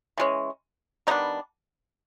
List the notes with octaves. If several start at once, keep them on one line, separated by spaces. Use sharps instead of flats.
E3 G#3 C#4
D#3 G3 B3 D4 D#4